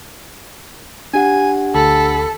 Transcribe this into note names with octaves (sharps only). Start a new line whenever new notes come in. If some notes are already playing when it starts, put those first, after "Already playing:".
D4 G4 F#5 G#5
D2 A4 B5